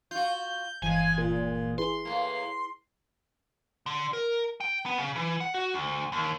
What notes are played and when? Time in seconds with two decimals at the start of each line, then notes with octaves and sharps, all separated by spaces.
0.11 F4 F#4 G6
0.82 G1 E3 F3 G#3 G#5
1.18 A#2
1.78 E4 G#4 B4 C6
2.05 A2 A#3
3.86 D3
4.13 A#4
4.61 G5
4.86 B3
4.98 C#3
5.16 E3
5.41 F#5
5.54 F#4
5.74 D2
6.12 D#2